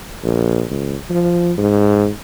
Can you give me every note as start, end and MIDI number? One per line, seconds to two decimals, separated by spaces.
0.23 0.64 34
0.70 0.95 37
1.10 1.52 53
1.58 2.08 44